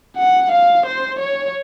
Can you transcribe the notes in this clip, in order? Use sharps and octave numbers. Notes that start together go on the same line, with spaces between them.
F#5
F5
C5
C#5